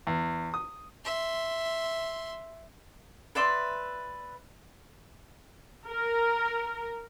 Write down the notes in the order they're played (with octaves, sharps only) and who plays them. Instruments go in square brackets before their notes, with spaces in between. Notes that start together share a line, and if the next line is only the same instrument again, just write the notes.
[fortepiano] E2
D#6
[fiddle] E5 C6
[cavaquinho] B4 D5 E5 C6
[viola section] A#4